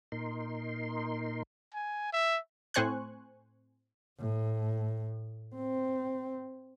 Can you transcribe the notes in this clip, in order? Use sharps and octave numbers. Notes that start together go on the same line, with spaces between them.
A#2 D#4 A#4 C6
G#5
E5
A2 C4 C5 G#5 C#6 F#6
A2
C4